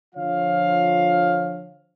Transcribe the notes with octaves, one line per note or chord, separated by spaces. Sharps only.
D3 F3 F4 C#5 F5